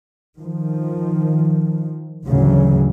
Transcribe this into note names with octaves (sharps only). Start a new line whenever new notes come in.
D#3 F3
D2 A2 C#3 E3 F#3